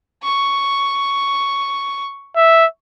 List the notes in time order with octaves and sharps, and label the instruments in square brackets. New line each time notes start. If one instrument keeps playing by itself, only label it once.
[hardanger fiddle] C#6
[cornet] E5